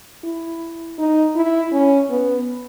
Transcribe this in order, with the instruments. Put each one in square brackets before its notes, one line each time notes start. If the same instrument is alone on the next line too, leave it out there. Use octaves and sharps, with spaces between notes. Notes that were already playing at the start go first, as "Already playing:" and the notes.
[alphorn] E4
D#4
E4
C#4
B3